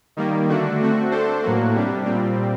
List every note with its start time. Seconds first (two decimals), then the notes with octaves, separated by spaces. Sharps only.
0.17 D#3 G3 A#3
0.49 D3 A3 D4 F#4
0.80 A3 C4 F#4
1.11 A3 D4 A4 C5
1.43 A2 F#3 A#3 F#4
1.74 C3 G3 D4
2.05 A#2 G3 C4